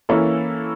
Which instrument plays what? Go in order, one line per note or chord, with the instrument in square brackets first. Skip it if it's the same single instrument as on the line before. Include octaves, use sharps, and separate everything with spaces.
[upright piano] E3 A#3 C#4 E4 A4